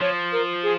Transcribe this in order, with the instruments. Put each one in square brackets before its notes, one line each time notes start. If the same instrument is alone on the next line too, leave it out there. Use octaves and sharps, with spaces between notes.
[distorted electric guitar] F3 [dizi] C#5
[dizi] A#4
G#4